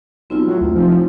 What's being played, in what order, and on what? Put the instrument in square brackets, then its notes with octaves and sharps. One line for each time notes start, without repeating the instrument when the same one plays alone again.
[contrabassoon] B1 [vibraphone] C4 E4 F4
[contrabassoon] A2 [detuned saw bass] F#3
[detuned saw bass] D2
[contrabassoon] F1 [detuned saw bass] F3